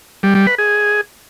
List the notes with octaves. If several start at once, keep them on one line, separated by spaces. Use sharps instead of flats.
G3
G3
B4
G#4